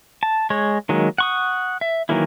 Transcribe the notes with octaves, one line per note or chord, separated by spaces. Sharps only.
A5
G#3 C#5
D#3 F#3 G#3 A#3
F#5 C#6 D#6
E5
D#3 E3 F#3 A#3 E4